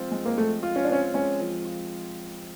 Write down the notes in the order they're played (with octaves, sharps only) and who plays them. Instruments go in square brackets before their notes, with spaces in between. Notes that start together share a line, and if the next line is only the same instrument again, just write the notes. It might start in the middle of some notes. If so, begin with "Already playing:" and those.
Already playing: [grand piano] F3 G#3 C4 F4
G#3
[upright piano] A#3
[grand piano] F3 [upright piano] A3
[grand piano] F4
[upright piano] C#4
D4
[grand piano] C4 [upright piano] C#4
[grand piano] G#3 [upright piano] C#4
[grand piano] F3
F4